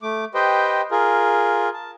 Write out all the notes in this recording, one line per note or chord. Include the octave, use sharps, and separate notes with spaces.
A3 D6
G4 B4 C5 D#5 G5
F4 G#4 A#4
A5